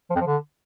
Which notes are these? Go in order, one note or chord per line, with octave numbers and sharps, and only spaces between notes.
F3
F2
F3
D3